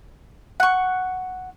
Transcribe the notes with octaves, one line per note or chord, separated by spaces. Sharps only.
F#5 C#6